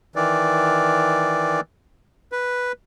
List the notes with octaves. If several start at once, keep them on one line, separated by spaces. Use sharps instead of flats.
D#3 E3 D5
B4